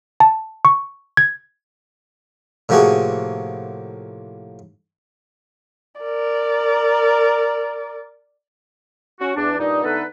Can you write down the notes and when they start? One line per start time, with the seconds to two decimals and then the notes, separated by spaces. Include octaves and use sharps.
0.20 A5
0.65 C#6
1.17 G#6
2.69 A2 C3 F3 A#3 F#4 G#4
6.01 A#4 D5
9.20 C#4 F#4
9.36 E2 D4
9.59 G2 A#2 D4 D#4
9.84 D3 A3 B3 D#4 A4 B4